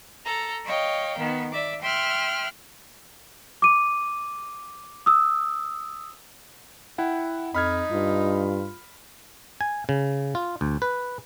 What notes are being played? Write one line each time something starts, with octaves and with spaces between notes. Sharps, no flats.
A4 A#5
C#5 D#5 F5 G5
D#3 B3
D5 E5 D6
E5 G5 C6 F6 F#6
D6 D#7
D#6 E6
E4 F#5 G5
F2 D#4 B5 F6 G#6
G2 F4
G#5
C#3
F4
D2
B4